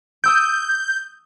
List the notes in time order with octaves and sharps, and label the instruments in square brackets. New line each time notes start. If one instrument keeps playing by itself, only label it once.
[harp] D#6 E6 D7 [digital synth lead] G6